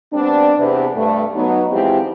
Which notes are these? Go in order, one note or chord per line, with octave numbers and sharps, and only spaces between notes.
G3 B3 C4 D4
E2 C3 B4
G2 A3
F#3 B3 D#4
E2 F3 G#3 C4 E4 G4